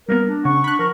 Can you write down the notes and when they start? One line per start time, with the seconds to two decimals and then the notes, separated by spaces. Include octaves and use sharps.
0.09 G3 A#3 B3 A#4
0.26 D4
0.45 C#3 F#5 C#6
0.64 D4 B5 F#6
0.79 F3 A#4